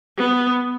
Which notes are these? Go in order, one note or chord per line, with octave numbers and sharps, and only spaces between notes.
B3